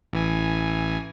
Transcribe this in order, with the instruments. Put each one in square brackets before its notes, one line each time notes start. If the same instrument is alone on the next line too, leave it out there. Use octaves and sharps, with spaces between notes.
[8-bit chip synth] A1 E3 G#5